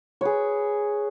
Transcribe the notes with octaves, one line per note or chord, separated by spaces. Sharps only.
G#4 B4 C#5